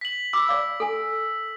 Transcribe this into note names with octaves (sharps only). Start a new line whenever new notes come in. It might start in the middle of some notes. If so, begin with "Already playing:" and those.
B6 F#7
B5 D6 E6
D5 F5 D6
A4 G#5